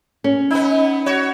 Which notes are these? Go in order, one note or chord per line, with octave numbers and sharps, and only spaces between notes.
C#4
B3 D#4
F#4 C#5